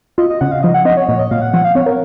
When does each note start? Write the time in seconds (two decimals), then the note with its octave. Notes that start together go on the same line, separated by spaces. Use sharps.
0.18 F4 D#5
0.30 D#5
0.41 C#3 F#5
0.51 F5
0.63 F3 D#5
0.74 F#5
0.85 C4 D#5
0.97 C#5
1.08 A#2 C#5
1.19 D#5
1.31 A#2 F5
1.42 F#5
1.53 F3 F#5
1.65 F5
1.75 C4 C#5
1.86 A#4